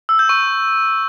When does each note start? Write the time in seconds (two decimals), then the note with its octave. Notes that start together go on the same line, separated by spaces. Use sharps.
0.09 E6
0.19 G6
0.29 C#6